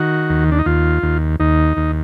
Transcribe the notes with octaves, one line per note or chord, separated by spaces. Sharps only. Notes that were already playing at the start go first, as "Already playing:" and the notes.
Already playing: D#3 F#4
D#2
D4
D#4
D#2 F4
D#2
D#2 D#4
D#2